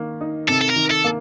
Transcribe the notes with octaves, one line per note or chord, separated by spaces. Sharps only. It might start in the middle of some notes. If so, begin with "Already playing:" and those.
Already playing: D#3 A#3
D#4
C3 A4
A4
A#4
D#3
A4
A#3